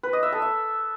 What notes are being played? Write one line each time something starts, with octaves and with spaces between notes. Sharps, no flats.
B4
D#5
E5
A4
E5